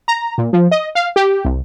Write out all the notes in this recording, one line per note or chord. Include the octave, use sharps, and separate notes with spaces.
A#5
A#2
F3
D#5
F5
G4
C2